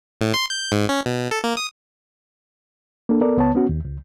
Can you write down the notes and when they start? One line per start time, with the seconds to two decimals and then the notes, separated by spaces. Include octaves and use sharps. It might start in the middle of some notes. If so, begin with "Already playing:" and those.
0.21 A2
0.34 C6
0.50 G6
0.72 G#2
0.89 C#4
1.06 B2
1.31 A4
1.44 A#3
1.57 D#6
3.09 A#3 D4 A4
3.21 B3 A4 A#4 D5
3.37 C#2 B3 C#5 A5
3.55 B3 C#4 F#4
3.69 D#2
3.85 C#2